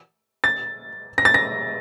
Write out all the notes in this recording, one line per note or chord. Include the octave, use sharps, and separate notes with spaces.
A6
A#6
A6
A#6